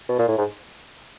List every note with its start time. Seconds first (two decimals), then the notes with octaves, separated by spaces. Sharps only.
0.09 B2
0.19 A#2
0.28 A2
0.38 G#2